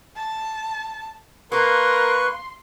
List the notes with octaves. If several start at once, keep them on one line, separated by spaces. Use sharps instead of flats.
A5
A#3 A#4 B4 C6 C#6 F#6